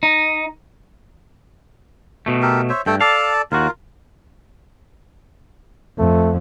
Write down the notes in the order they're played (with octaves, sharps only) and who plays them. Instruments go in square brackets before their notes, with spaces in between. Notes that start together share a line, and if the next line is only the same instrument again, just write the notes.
[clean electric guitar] D#4
B2 A3
[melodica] G4 A4 A#4
C5 C#5 E5
[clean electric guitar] G2 [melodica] A3 A4 G5
[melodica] A4 D5 A5 [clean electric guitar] F5
[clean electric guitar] D#2 F#4 [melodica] F4 A#4
[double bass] F2 [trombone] A3